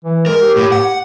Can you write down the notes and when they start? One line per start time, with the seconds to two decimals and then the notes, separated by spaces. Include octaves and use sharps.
0.04 E3
0.26 G#3 A#4
0.41 G4
0.56 A2
0.72 F#5